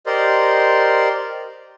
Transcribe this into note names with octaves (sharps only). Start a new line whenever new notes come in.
G4 A#4 C5 D5 D#5 C6